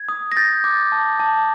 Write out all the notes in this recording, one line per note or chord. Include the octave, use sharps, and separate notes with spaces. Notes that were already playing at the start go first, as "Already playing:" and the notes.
Already playing: G#6
D#6
A#6
G6 A6
D6
A5
A5